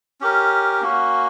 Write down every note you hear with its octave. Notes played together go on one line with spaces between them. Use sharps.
C#4 G4 A#4
A#3 C#4 F#4